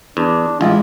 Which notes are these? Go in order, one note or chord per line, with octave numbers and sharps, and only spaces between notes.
E2 D4
A1 E3 G#3 E4 F4